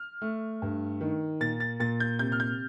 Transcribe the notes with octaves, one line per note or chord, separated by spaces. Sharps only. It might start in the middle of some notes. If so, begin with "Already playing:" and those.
Already playing: F6
A3
G2
D#3
A#2 A6
A6
A#2 A6
G6
C3 G6
F6
G6